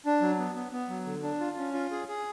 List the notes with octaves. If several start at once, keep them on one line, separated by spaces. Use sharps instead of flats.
D4
F#3
B3
B3
B3
F#3
D3
D4
F4
C#4
F4
G#4
G#4